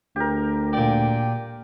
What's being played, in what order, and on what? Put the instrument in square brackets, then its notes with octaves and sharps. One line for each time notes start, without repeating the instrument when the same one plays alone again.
[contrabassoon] D2 [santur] G4 A#4
[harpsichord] A#2 D5 [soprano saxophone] G5